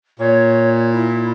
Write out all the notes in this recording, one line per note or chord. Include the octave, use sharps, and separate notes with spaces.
A#2 C#5
E4